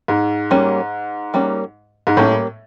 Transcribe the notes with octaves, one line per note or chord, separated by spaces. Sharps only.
G#2
G3 A#3 C#4
G3 A#3 C#4
G#2
A2 G3 A#3 C#4